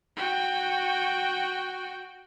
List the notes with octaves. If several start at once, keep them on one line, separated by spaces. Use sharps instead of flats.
F#4 G5